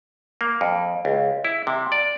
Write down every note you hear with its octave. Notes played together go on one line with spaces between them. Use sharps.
A#3
F2
C#2
E4
C3
D5